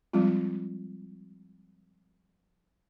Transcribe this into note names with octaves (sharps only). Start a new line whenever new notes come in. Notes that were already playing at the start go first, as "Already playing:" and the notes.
F3 G3 G#3 C4 F4